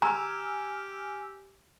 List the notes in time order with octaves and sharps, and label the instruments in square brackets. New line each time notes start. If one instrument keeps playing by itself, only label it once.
[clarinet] G4 [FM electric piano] G#5 E6 F6 [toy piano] A#5